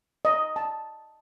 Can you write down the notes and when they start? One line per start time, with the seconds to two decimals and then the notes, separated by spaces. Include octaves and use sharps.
0.25 D#5
0.56 A5